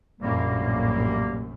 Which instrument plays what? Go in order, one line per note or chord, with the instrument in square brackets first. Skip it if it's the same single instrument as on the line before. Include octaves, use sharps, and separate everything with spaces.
[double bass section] A#1 F#2 A2 [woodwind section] C3 G3 A#3